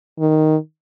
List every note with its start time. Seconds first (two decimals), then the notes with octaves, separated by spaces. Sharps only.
0.20 D#3